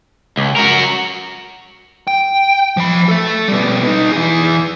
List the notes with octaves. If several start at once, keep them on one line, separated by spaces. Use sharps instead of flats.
C#2
F#4 A#4
G5
F3 B5
A4 E5
B2 G3
B2 D#4
E3 G#4